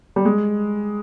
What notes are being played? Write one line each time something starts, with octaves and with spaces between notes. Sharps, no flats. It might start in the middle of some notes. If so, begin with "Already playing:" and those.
G3
G#3